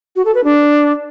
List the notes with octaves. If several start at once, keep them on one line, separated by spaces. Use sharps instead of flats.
F#4
A4
B4
D4